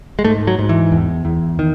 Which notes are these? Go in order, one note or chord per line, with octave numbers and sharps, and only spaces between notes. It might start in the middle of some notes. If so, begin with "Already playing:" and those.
G#3
G#2 A3
F#3
G#2
E3
E2
E2
D#3